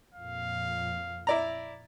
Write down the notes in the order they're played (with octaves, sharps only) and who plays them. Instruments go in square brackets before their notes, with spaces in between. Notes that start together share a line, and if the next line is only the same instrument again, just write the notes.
[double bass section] F2 A#2 [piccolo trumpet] F5
[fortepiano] E4 D5 A#5